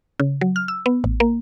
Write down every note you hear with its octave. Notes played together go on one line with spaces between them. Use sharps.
C#3
F#3
F6
E6
B3
A1
A#3